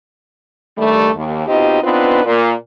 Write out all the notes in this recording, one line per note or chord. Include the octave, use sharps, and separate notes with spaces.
G2 D#3 G3 A3
D#2
B2 C4 D#4 F4 G4 D#5
B3 C4 D4 D#4 F4 B4
A#2 A#3